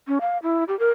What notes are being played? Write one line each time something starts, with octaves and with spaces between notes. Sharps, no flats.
C#4
F5
E4
G4
A#4